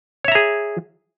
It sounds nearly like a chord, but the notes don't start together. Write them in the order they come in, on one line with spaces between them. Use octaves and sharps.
C#5 E5 A#5 G#4